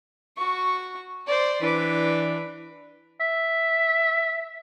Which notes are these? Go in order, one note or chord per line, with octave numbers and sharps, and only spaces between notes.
F#4 C#6
C5 D5
E3 D4 B4 D6
E5